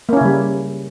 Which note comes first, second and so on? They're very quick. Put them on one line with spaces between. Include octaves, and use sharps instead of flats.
A#3 C#4 E4 C#3 G3